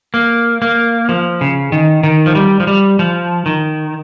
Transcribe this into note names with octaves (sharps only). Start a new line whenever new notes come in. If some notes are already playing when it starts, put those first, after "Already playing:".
A#3
A#3
F3
C#3
D#3
D#3
F3
G3
F3
G3
F3
D#3